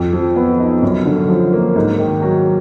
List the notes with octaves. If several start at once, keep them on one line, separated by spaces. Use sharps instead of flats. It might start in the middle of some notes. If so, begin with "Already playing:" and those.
Already playing: F2
F3
B3
D#4
F#2
D3
F3
A#3
G#2
D#3
F#3